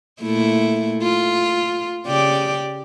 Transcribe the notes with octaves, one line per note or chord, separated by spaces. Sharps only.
A#2 A3 E4
F4
C#3 G4 D5